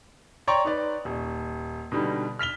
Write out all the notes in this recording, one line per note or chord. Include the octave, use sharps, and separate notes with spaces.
C#5 D5 G5 A#5 C6 C#6
D#4 B4 D5
D#1
B2 D3 G3 D#4
F6 B6 F7 G7